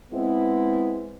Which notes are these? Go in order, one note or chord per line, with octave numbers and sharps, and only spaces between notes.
G#3 B3 C4 E4